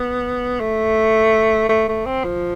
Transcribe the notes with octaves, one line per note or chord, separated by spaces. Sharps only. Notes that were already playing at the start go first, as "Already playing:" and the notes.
Already playing: B3
A3
A3
A3
C4
F3